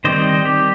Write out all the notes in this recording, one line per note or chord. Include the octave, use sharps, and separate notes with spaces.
D#3 G3 C4 C5 D#5
G4